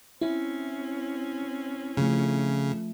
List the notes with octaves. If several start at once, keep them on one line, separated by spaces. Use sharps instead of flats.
C4 C#4 E4
C#3 F3 A3